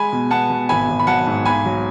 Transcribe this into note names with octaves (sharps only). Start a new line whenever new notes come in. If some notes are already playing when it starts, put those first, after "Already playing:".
Already playing: G#3 G#5 B5
B2
B3 F#5 A5
B2
G#1 G#5 B5
G#1
B5
F#3 F#5 A5
G#2
B1 G#5 B5
F#3